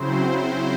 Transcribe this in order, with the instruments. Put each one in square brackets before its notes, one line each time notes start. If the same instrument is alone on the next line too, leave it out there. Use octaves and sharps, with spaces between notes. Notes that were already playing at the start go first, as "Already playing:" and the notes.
Already playing: [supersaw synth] C#3 F#3 C4 E4 C5